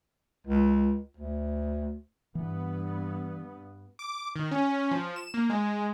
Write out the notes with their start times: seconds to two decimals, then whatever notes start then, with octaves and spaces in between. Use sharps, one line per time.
0.47 C#2
1.17 D2
2.35 G2 E3 B3
3.99 D6
4.36 D#3
4.51 C#4
4.91 F3
5.16 E7
5.34 A#3
5.50 G#3